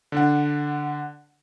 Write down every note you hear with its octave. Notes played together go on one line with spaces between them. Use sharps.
D3 D4 F#5